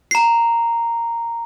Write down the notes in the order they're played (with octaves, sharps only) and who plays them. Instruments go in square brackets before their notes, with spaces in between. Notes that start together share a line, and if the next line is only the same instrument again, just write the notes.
[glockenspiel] A#5 C7